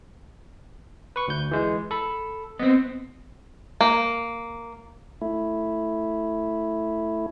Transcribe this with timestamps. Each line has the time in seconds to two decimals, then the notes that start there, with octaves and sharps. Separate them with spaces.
1.16 B4 C#6
1.28 D2 G6
1.51 E3 G#3
1.91 A4 B5
2.60 B3 C4 D#5
3.81 A#3
5.21 A3 E4